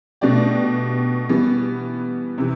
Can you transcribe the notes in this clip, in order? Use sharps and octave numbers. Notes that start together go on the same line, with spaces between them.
B2 A3 D4 G4 D5
E3 G3 B3
C3 E3